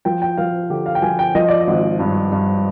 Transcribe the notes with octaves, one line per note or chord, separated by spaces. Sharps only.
F3 G5
G5
F3 F5
D3 G4
F5
G5
F3 G#5
G5
F3 D#5
D5
D#5
G#1
G2
G2